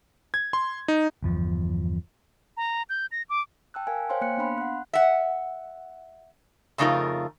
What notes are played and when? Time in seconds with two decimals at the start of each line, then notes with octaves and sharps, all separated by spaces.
0.34 G#6
0.53 C6
0.88 D#4
1.22 G1 E2 F3
2.57 A#5
2.89 G6
3.12 A#6
3.30 D6
3.74 G5 A5 E6 F#6
3.87 A#4 F5 G#5
4.09 C5 C#5 F5 G5 G#5 C6
4.21 A#3 F#6 C#7
4.37 B3 D4 F5 B5 C6
4.58 F#5 F#6
4.93 E5 F#5
6.78 F2 C#3 A3 D#4 F4 A#4